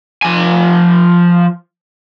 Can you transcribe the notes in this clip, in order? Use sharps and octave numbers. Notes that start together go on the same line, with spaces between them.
F3 G#5